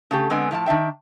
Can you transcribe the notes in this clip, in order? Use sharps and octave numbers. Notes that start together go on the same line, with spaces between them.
C#3 A3 G4
D3 G#3 B3 C4 G#5
A2 F3 E5 A5
D#3 D4 E5 G5